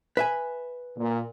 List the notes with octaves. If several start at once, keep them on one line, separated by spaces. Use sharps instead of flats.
B4 E5 G#5
A#2